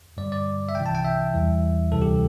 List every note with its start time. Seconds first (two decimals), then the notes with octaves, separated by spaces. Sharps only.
0.17 G2 D3 G3 D5
0.32 D5
0.69 E5
0.75 C2 C3 E3 G5
0.86 A5
0.95 G5
1.05 E5
1.33 E2 E3 G3
1.92 D2 C3 E3 G3 A4
2.02 G4